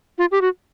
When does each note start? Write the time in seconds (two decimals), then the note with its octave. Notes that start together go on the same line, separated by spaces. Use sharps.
0.18 F4
0.32 G4
0.41 F#4